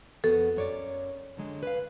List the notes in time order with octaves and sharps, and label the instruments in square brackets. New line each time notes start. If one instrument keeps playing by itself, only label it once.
[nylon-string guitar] F2 B3 F#4 [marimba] A4
[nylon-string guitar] F#2 C#5 D5
D3 F#3 G#3
B4 F5